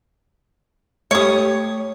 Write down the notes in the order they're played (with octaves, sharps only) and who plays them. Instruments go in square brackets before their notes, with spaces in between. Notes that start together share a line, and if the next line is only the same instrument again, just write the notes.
[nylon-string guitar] A3 G4 [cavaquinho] C#5 D#6